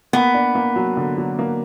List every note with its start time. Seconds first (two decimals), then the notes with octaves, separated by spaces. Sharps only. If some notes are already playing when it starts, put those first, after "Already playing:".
0.13 A#3 B3
0.34 D4
0.55 A#3
0.76 F#3
0.97 D3
1.18 F#3
1.39 A#3